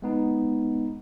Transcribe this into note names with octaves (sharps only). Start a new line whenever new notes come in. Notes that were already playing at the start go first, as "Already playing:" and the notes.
G#3 B3 D#4